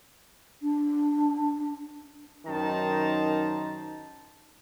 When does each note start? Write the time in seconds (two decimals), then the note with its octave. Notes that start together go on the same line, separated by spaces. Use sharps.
0.62 D4
2.46 F#2 D#3 D#4 C5 A5 A#5